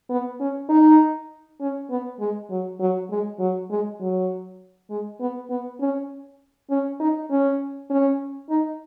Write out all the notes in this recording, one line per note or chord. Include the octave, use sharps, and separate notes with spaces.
B3
C#4
D#4
C#4
B3
G#3
F#3
F#3
G#3
F#3
G#3
F#3
G#3
B3
B3
C#4
C#4
D#4
C#4
C#4
D#4